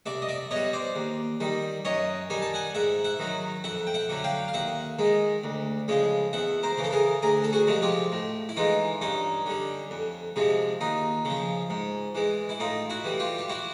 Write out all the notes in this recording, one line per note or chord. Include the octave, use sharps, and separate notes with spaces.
C2 D5 E5
D#5
D5 E5
B2 G3 C#5 D#5
C5 D5
D#2
D#3 G3
F#2 C#5 D#5
D#3 G3 G#5
A5
F#5 G#5
G#2 E5 F#5
E5 F#5
D#3 F#3
F2 E5 F#5
G5
E5 F#5
D3 F#3
F5 G5
F5
D#2 E5 F#5
D#3 G#3
D2
C#3 F3 G#3
E2 E5 F#5
A#4 C5
C#3 E3
A4
G#4 A#4
D2 G#4 A#4
A4
F#4 G#4
C3 F3 G#3
F4 G4
A2
E4
E3 G#3 D#4 F4
G2 C#4 D#4
D3 G3
F2
C3 F3 G#3
D#2 D#4 F4
C#3 F3
G#2
E3 G#3
E4
A2 D#4 F4
E4 F#4
E3 G3
F4 G4
G4
E4 F#4